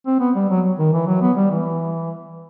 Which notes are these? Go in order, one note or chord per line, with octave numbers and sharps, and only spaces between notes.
C4
B3
G3
F#3
D#3
E3
F#3
B3
G3
E3